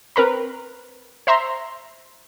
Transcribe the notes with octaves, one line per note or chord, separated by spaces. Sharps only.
C4 A#4 B4 A#5
C5 E5 A#5 C6